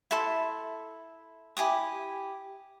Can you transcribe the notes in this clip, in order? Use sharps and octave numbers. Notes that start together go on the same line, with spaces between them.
E4 A4 E5 C6
E4 G4 G#5 D#6